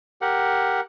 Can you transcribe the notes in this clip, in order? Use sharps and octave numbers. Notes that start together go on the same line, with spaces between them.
G4 A#4 F#5